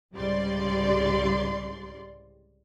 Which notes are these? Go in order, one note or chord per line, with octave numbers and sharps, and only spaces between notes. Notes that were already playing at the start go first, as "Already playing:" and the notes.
C2 G#2 C#3 G3 D5 C6